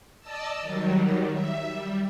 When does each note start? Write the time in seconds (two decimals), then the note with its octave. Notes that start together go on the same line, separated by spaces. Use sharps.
0.20 D5 D#5 A5 E6
0.61 D#3 F#3 G3
1.31 E5
1.68 G3